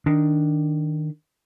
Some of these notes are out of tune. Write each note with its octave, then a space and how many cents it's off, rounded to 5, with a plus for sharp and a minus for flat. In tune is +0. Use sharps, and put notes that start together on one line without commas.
D#3 +0 D4 +0